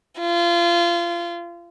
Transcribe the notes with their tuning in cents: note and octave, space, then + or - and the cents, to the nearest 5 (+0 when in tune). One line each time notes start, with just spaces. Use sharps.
F4 -25